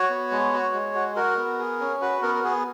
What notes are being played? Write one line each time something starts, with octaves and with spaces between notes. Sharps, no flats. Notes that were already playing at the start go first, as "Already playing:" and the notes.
Already playing: F#4 C#5
B3
G#3
F#4
G#3
F#4
F#4 A#4
B3
G#4
C#4
F#4 B4
B3 A#4
A#4
B3 G#4